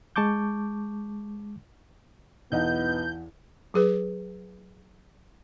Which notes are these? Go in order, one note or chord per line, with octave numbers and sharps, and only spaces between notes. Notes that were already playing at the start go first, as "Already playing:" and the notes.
G#3 A5 C#6 D6 G6
B1 E2 B3 D#4 F#5 G6
F#3 G#4 B4